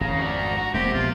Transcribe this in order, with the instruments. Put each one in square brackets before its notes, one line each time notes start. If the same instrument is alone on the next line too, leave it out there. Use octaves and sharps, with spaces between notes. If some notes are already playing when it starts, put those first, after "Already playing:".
[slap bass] G#1 F2 [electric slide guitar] C#3 [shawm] A#5
[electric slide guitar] D4 F#4
[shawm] A#5
[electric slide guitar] F#4
[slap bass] E1 G#3 A#3 [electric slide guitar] C3 [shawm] G4
[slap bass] A#1 B2 [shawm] F4